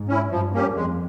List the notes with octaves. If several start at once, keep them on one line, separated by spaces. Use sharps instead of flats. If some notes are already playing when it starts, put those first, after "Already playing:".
Already playing: G#2
C#4 E4
G2 F3
A#3 C#4 G4
F2 G#3